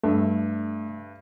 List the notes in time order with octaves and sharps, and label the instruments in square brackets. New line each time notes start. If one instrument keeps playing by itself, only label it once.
[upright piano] G2 [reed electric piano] A3 E5